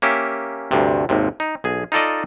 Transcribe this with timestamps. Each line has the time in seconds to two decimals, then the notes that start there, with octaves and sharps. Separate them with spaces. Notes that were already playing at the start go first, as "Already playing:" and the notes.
0.02 A#3 C#4 G4 E5
0.71 D2 G2 C3
1.09 G#1 D#2 C3
1.40 D#4
1.64 B1 G#4
1.92 D#4 F4 A4 D5 D#5